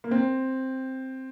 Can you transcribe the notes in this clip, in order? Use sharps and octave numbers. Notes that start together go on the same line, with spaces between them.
A#3
C4